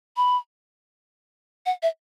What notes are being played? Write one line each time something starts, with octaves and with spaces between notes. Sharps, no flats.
B5
F#5
E5